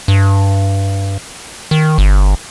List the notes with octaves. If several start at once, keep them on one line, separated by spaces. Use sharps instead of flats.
G2
D#3
G1